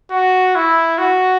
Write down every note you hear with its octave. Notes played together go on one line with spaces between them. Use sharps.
F#4
E4
F#4